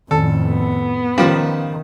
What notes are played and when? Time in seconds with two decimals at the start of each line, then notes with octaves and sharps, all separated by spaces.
0.11 F2 A2 D#3 A4
0.47 B3
1.18 D#3 F3 G3 C#4 F5